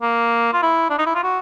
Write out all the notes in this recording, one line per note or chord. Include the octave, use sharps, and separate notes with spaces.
A#3
F4
E4
D4
D#4
E4
F4
F#4